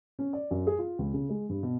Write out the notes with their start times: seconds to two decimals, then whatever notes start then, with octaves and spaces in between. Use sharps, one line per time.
0.19 C#4
0.33 D5
0.51 F#2
0.67 G#4
0.79 F4
0.99 C#2
1.14 C#3
1.30 G#3
1.49 G2
1.63 B2